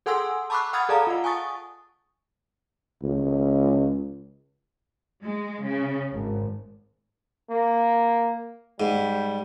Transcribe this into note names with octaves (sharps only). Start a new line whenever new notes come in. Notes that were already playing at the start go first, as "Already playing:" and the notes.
G#4 A4 F#5 G#5 C6 E6
A5 B5 C#6 D6 E6 F#6
F#5 B5 D#6 F6 G#6 A6
G#4 A4 D5 F5 A5 A#5
F4 F#5
G#5 A5 C#6 D#6 A6
C#2
G#3
C#3
G#1
A#3
G#2 G3